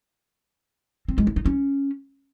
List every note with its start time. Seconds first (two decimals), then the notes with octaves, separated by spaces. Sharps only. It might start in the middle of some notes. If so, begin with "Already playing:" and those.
1.08 C4
1.18 G#3
1.27 E4
1.36 D#4
1.46 C#4